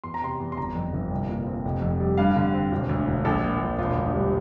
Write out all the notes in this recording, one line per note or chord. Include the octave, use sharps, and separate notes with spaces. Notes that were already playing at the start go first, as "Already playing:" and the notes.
E2 C6
A#5
C3 C6
E2
C6
G1 A#5
F2
G1
C2
A#2
C4
F1
F2
G3
G2 F5
D3
C4
E1
D2
E1
A#1 A4
A#2
A#1
E1 F4
D2
G3